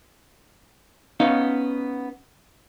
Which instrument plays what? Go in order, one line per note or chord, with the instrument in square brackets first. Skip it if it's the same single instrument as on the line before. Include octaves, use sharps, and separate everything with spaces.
[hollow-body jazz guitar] B3 C#4 D#4 F5